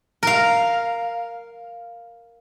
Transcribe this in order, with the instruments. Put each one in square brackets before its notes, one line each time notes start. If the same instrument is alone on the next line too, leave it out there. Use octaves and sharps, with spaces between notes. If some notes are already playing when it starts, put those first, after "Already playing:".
[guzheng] A#4 F5